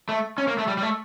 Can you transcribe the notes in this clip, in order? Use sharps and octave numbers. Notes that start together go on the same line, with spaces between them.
A3
C#4
A#3
A3
G3
G3
A3